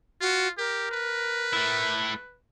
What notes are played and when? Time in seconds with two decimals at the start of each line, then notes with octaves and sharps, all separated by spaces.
0.21 F4 F#4
0.58 G4 A#4
0.91 B4
1.53 A3 E4